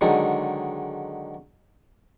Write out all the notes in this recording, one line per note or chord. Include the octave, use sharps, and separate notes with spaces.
D3 D#3 F#3 G#3